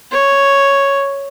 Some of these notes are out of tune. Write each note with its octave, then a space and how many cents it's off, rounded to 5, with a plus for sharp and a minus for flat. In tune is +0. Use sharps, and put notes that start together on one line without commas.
C#5 +0